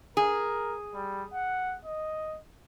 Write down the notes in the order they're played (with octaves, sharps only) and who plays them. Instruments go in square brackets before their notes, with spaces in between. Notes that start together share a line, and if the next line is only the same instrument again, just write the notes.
[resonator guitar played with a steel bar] G#4 [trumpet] A#4
[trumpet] G3
F#5
D#5